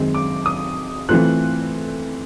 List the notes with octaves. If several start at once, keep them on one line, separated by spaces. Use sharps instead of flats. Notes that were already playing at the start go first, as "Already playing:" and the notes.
Already playing: F#2 D#3 G#3 C4
D6
D#6
E3 A3 C4 F4 F#6